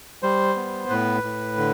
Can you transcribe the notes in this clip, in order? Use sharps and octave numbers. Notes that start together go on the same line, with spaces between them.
G3 C5
B3
A2 B4
A2
D3